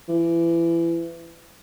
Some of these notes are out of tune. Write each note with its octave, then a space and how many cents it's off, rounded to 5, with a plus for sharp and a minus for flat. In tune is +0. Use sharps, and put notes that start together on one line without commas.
E3 +25